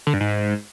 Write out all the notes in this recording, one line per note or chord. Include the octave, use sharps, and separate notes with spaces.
D3
G2
G#2